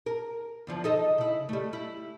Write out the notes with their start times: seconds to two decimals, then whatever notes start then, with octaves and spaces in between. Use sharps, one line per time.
0.06 A#4
0.67 E2 D3 F3
0.84 D#4 A4 D#5
1.18 C#3 E4
1.49 G3 A3
1.73 E4